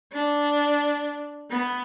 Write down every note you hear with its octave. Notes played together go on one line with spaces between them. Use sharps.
D4
B3